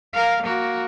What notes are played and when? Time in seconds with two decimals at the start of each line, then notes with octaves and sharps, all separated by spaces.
0.13 A#4 F5
0.42 A#3 F#4